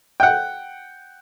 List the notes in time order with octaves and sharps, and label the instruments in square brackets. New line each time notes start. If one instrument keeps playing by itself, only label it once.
[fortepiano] F#5 G5